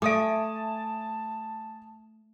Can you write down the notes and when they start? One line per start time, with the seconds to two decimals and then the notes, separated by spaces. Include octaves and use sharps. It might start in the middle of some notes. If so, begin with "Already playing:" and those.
0.02 A3 E5 G#5 A5 D6 D#6 D7